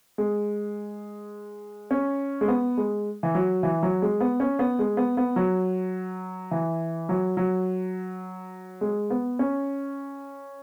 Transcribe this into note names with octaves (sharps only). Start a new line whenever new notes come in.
G#3
C#4
G#3
B3
G#3
E3
F#3
E3
F#3
G#3
B3
C#4
B3
G#3
B3
B3
F#3
E3
F#3
F#3
G#3
B3
C#4